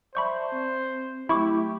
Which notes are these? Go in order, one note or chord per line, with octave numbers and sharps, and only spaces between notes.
C5 D5 E5 A5 B5 C#6 G6
C4
F#3 A3 E4 G4 B5 C#6 D6